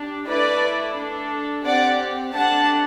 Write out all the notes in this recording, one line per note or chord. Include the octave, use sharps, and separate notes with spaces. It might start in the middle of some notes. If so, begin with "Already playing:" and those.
Already playing: D4 G4
A3 E4 A4 B4 D5
D4 A4
C4 G4 D5 F#5
A3 D4 G4 F#5 A5